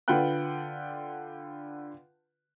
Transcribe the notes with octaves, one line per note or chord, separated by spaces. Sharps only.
D3 F4 B4 F#5 G5 F#6